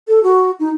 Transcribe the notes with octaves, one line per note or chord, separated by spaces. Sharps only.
A4
F#4
D#4